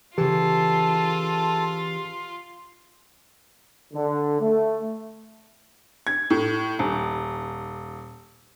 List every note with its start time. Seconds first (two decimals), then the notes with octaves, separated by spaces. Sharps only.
0.18 C#3 E3 F4 G4 A4 A5
3.93 D3
4.41 A3
6.07 G#6
6.30 A2
6.79 D#1